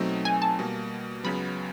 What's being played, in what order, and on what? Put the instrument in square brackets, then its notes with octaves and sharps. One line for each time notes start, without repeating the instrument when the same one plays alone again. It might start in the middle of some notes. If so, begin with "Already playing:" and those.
Already playing: [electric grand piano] B2 F#3 A3 C4 D#4
[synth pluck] G#5
A5
[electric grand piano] B2 G3 A#3
[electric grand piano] C#2 C#3 F#3 B3 [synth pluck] B5